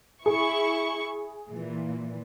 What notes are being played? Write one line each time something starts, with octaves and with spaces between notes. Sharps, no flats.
E4 G#4 C#6
A#2 E3